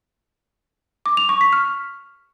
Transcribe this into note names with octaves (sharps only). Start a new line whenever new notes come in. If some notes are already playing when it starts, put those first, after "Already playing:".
D6
F7
C#6
B6
F6